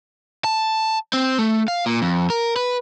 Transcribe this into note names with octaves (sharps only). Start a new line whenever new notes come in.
A5
C4
A3
F5
A#2
F2
A#4
B4